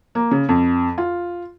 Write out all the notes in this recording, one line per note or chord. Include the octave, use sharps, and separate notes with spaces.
A#3
C#3
F2
F4